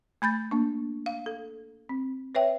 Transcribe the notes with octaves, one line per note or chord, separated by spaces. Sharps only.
A3 B5 G6 A6
A#3 D4
F5
A4
C4
B4 C#5 E5 G5